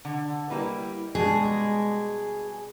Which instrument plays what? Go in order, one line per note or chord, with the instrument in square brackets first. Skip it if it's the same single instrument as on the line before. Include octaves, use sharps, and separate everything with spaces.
[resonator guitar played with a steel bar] D3
[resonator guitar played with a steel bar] G3 A#3 B4 [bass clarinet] E4
[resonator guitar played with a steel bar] B2 G3 D4 [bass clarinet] G#3 [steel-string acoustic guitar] G#4